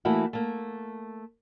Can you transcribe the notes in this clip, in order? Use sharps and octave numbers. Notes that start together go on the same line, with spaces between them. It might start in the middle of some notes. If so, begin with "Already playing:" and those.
E3 A3 A#3 E4 F#4
A3 A#3